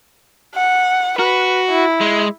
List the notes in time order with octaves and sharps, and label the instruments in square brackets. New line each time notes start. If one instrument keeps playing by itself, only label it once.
[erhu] F#5
[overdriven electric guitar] F#4 [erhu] B4
[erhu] E4
[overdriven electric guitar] G#3